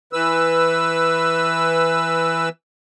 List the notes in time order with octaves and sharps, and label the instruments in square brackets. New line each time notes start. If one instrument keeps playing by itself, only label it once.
[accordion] E3 B4 E6